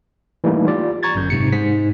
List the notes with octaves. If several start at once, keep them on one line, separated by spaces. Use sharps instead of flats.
E3 G3 A3 A#3 D#4
F4 G4 D5
A#5 C#6 G#6 A6
G1 F#2 G6
G#2 C3 C#7
G#2 B6